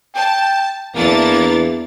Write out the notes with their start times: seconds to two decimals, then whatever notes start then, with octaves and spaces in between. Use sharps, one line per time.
0.15 G5 A5
0.95 E2 E3 A#3 D4 A6